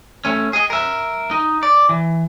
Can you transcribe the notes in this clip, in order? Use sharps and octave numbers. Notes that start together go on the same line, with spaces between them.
A3 C#4
G#4 D#5
A#4 E5
D#4
D5
E3